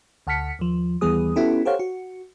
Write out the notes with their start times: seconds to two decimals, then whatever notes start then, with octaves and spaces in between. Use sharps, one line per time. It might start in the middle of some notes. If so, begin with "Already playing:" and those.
0.27 D2 F#5 A5 F6 B6 C#7
0.59 D#2 F3
1.01 D#2 E3 G3 B3 G#4 D#6
1.36 B3 C#4 E4 F#4 G4 A4
1.65 G4 A4 C5 C#5 F5 F#5
1.79 F#4